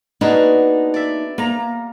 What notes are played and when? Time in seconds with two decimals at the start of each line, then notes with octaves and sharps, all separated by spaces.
0.21 A#3 B3 D4 D#4 F#4 G#4
0.94 D5 E5
1.38 A#3 A#5